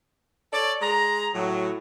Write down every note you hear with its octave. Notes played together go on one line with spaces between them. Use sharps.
A4 C#5 D5
G#3 G#4 A#5
A2 F#3